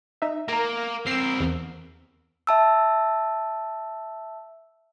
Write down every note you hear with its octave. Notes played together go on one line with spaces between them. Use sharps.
D#4 E5
A#3 A#4 A#5
C4 A#4 E6 C7
E2
E5 A5 E6